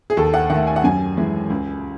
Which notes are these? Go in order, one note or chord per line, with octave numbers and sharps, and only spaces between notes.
G#4
D#2 A4
F#5
D#3 A3 F#5
G#5
F#5
F#2 G#5
E3 G#3
C#2